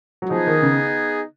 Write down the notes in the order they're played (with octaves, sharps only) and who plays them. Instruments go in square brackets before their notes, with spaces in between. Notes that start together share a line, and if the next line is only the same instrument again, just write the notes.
[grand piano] F#3
[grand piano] F3 [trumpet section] B3 D#4 G#4
[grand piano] D#3
C#3